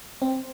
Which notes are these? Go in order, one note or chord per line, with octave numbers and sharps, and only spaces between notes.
C4